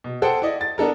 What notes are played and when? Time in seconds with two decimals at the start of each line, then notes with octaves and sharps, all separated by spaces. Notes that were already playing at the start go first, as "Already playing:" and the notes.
0.04 B2
0.22 G#4 A4 C5 F#5 G5 A5
0.42 E4 D5 D#5
0.61 A6
0.78 B3 D4 A4 A#4